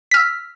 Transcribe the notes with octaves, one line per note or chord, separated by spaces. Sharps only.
E6 F6 B6